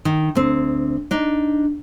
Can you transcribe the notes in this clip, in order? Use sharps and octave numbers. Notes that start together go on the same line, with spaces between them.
D#3
D2 C4
D4 D#4